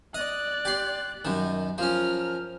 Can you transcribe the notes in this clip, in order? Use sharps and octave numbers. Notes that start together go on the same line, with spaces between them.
D5 D#5 F#6
G4 C6
F#2 D#3
F3 C#4 A#4 F6